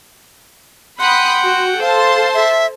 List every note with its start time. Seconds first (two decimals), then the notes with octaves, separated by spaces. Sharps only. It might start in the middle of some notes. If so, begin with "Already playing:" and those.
1.00 F#5 G5 B5 C6 D#6 F#6
1.46 F#4
1.81 A4 C5 F5 A5 C6
2.34 E5